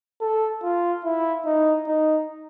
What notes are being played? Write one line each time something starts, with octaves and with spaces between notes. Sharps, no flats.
A4
F4
E4
D#4
D#4